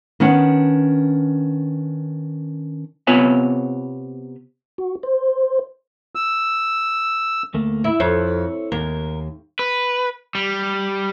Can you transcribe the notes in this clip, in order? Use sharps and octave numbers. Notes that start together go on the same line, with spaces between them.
D#3 B3 C#4 D4 F#5
C3 B3 F4 B4 C#5 G#5
F#4
C5
E6
D2 A3 A#3
E4
F2 E4 A4 C#5
D#2 A#4
B4
G3